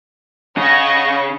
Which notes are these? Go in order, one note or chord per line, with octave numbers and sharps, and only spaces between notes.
C#3 D#5 F#5 C#6 A#6